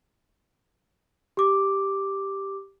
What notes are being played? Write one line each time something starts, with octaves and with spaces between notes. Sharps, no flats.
G4 D6